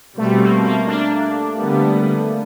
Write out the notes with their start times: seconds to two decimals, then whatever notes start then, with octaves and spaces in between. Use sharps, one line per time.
0.18 B2 G3 A3 C4
0.41 A#3
0.64 A#3
0.87 D4
1.58 D3 G3 B3